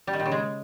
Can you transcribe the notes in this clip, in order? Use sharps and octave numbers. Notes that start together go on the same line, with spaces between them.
G3
D#3
A#2
C#3
G#3